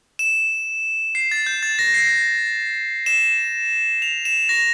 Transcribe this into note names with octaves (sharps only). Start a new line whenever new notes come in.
E7
C7
A6
G6
A6
A#6
C7
E7
F7
E7
A#6